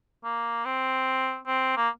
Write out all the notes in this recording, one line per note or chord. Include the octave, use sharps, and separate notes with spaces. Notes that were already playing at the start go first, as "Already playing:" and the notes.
A#3
C4
C4
A#3